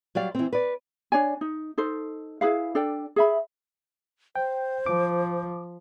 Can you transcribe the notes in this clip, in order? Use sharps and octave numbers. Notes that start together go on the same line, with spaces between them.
F#3 G3 D5 F5
E3 C4
B4 D5
D4 C#5 D5 G#5
D#4
D#4 A4 C5
E4 G#4 B4 F5
D4 A4 D5 G5
G#4 E5 B5
C5 G5
F3 D6